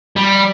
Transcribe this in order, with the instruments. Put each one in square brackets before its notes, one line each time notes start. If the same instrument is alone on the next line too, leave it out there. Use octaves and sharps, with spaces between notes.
[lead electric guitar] G3